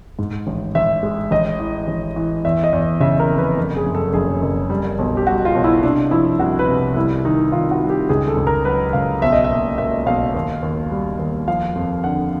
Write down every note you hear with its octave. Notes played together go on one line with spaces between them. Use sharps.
G#2
A1
A1 E5
G#3
A1 D#5
E3
A1
E3
E2 E5
D#5
E2
C#3 E5
A#4
F1
B4
F#1
G#4
F#2
A4
F#1 G#4
F#1
G3
B1
G4
G3 F#4
F4
B1
E4
C3 D4
F3 E4
C2 F#4
B4
C3
G3 E4
D#3 D#4
D#3 F4
F#4
G3
G4
C#2 G#4
A4
C#2
A#4
F#3 B4
C#2 F5
B1 E5
D#5
E5
A#2
A#2 E5
B1 F5
D#2
D#2
G3
D#2
F3 F5
F2
D3 F#5